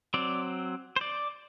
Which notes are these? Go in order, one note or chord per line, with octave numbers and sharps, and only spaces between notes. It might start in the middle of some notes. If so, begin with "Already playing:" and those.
F#3 C4 D5
C5
D5